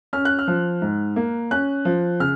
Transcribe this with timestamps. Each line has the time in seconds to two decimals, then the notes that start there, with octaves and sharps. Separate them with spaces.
0.13 C#4 F6
0.25 F#6
0.39 F6
0.48 F3
0.82 G#2
1.16 A#3
1.51 C#4 F#6
1.85 F3
2.20 C#3 F6